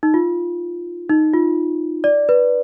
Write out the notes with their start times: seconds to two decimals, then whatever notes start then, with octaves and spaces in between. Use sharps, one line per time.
0.03 D#4
0.14 F4
1.10 D#4
1.34 F4
2.04 D5
2.29 B4